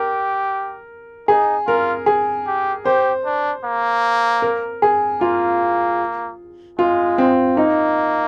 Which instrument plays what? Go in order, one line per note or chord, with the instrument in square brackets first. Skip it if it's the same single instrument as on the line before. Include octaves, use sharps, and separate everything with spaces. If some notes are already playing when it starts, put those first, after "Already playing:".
Already playing: [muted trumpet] G4 [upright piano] A#4
[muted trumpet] D#4 [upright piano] G#4
[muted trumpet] F4 [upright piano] A#4
[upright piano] G#4
[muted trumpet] G4
[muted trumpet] G4 [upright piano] C5
[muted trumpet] D4
A#3
[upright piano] A#4
G#4
[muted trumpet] A#3 [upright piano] F4
[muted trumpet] G#3 [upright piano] F4
[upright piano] C4
[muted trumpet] A#3 [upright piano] D#4